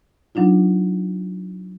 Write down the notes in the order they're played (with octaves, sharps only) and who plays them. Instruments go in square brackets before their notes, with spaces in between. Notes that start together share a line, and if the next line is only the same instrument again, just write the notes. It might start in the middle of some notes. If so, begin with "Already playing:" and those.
[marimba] F#3 D4 D#4 F4